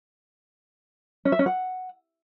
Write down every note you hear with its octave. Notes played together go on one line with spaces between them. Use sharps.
C#4
E5
C#4
F#5